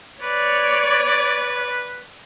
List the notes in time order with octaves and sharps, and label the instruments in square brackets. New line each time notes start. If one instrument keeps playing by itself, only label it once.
[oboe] B4 [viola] C#5 D5